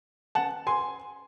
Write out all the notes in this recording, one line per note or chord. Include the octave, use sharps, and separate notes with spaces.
F#5 A5
G#5 C6